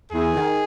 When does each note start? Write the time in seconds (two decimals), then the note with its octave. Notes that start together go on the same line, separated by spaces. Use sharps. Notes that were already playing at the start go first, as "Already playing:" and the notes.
0.12 E2 G#4
0.35 D#3